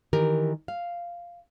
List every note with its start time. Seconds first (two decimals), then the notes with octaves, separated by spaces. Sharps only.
0.13 D#3 E3 G4 A#4
0.68 F5